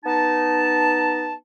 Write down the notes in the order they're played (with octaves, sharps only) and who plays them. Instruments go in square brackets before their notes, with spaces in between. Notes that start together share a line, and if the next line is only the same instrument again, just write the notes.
[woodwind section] B3 D#4 A5